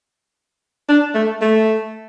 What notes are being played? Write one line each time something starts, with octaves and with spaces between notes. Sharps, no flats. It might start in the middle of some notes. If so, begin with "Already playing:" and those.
D4
A3
A3